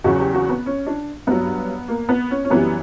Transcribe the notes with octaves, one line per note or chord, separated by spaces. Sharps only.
E2 C#3 F#3 F#4
G4
F#4
B3
C#4
D4
G2 F#3 B3
A#3
B3
C#4
C#4
F#2 E3 G3 B3